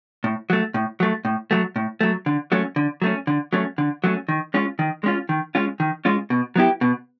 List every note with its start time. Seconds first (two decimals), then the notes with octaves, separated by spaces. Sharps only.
0.24 A2
0.50 F#3 A3
0.74 A2
1.00 F#3 A3
1.25 A2
1.51 F#3 A3
1.76 A2
2.01 F#3 A3
2.26 D3
2.52 F#3 A3 C#4
2.76 D3
3.02 F#3 A3 C#4
3.27 D3
3.53 F#3 A3 C#4
3.78 D3
4.04 F#3 A3 C#4
4.28 D#3
4.54 G#3 C#4 F4
4.79 D#3
5.04 G#3 C#4 F4
5.29 D#3
5.55 G#3 C#4 F4
5.80 D#3
6.05 G#3 C#4 F4
6.30 B2
6.56 F#3 B3 E4 G4
6.81 B2